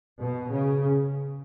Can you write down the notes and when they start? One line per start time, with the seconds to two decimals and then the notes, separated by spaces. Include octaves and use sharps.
0.21 B2
0.52 C#3